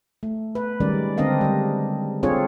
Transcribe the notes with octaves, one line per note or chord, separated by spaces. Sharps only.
A3
B4
D#3 G3 G#3 C#4 A#4 D5
D3 C4 D4 A#4 D#5 F5
G3 G#3
C4 D4 F4 G#4 A4 C#5